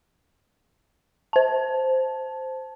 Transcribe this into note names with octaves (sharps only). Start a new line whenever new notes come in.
C5 A5